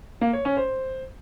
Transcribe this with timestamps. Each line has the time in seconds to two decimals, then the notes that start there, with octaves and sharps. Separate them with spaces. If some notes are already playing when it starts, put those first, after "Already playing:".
0.21 A#3
0.33 C#5
0.45 C#4
0.57 C5